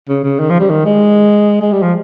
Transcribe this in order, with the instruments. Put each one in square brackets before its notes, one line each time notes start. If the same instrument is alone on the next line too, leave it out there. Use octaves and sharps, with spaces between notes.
[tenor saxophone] C#3
C#3
D#3
F3
G3
D#3
G#3
G#3
G3
F3